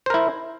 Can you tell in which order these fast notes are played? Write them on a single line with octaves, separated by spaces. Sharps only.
C5 A#4 E4